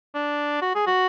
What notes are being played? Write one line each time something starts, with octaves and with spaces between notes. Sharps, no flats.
D4
F#4
G#4
F#4